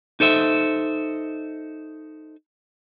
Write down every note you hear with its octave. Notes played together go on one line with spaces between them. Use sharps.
D#4 A4 C5 E5